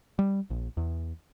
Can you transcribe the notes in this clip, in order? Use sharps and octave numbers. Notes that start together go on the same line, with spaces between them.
G3
A#1
E2